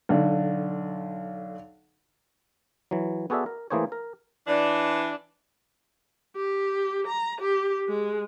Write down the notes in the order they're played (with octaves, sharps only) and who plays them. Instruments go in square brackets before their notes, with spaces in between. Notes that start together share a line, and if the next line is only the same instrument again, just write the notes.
[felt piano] B1 D3
[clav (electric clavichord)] E3 F#3
B3 F#4 G#4 A4 D5 E5
A#4
E3 A3 A#3 G#4 C5 C#5
A#4
[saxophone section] E3 D4
[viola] G4
A#5
G4
G#3